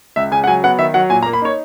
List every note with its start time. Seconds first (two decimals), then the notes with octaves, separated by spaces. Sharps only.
0.16 C#2 E5
0.31 C#3 G#5
0.44 F#5
0.47 F#3 G#5
0.64 B3 F#5
0.79 D#3 E5
0.94 F#3 F#5
1.10 A#2 G#5
1.23 A#5
1.26 A#3
1.33 B5
1.42 D#4 C#5